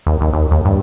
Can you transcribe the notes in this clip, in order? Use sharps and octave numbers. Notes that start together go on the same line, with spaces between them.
D#2
D#2
D#2
D#2
G2